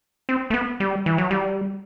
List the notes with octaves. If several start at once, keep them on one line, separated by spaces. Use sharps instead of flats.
C4
A3
B3
G3
E3
F#3
G3